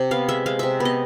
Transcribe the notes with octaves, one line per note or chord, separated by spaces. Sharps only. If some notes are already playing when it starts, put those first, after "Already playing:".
Already playing: C3
B3 F5
G#3 E5
G#3 F5
C3 E5
B3
D#5